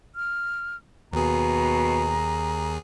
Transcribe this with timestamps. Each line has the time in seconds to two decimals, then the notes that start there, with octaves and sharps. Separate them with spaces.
0.15 F6
1.13 D#2 B2 G#4 A#5